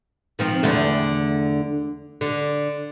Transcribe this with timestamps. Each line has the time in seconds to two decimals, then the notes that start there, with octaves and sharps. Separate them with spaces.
0.39 D#3 F3 C4
0.63 E2 D3 A3
2.21 D3